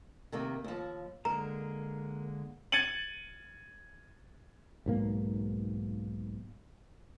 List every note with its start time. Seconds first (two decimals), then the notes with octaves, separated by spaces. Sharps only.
0.32 C3 D#3 A#3
0.64 D#2 F3
1.25 D3 G#3 A#3 A#4 A#5
2.72 G#6 A6 C#7 D#7 F#7
4.86 B1 G#2 A#3